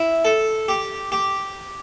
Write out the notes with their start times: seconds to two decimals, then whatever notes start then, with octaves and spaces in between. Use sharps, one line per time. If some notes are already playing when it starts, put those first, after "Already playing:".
Already playing: E4
0.25 A4
0.68 G4
1.12 G4